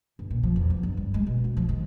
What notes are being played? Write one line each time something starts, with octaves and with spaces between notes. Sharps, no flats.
G1
A#2
F3
E2
F3
G1
G3
G#3
B2
D2
F3
D#3